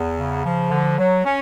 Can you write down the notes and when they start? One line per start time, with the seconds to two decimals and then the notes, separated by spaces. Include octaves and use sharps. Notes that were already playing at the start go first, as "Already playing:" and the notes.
Already playing: E2
0.17 C#3
0.44 F3
0.71 D3
0.98 F#3
1.25 C#4